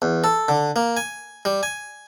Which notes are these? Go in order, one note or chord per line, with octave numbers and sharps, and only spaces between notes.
E2
A4
D3
A#3
G#5
G3
G#5